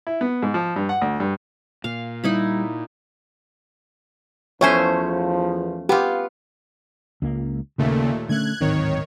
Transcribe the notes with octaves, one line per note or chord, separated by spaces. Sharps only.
E4
B3
G#2
F3
G2
F#5
D2
G2
A#2 F5
G3 D#4 E4 B5
E2 F3 A3 C#4 C5 C#5 E5 G#5
B3 F4 G4
C#2 A#3
D#2 A#2 C#3 A3
D3 A3 C#4 F#6 G#6
D1 G#1 D#3 C4 C#5